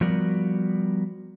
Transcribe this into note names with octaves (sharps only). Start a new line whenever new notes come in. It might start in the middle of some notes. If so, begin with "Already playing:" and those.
F3 G3 B3 F#4 A#4 D5